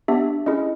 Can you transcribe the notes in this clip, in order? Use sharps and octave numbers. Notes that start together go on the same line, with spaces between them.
B3 D4 G4 E5
C#4 E4 G#4 D#5